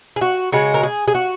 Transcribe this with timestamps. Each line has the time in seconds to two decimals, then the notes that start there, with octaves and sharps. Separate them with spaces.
0.16 G#4
0.21 F#4
0.52 C#3 G#3 F#4
0.74 A#4
0.83 G#4
1.08 G#4
1.15 F#4